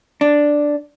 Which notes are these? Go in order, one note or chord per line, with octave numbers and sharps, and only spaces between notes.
D4